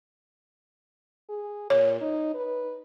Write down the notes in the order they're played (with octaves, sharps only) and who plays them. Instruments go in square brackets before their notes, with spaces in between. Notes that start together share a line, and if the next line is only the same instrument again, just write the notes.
[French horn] G#4
[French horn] A#2 [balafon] C#5
[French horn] D#4
B4